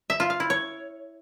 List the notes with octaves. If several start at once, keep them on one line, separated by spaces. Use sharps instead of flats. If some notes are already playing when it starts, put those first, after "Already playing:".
E5
F4
F5
E4
C#5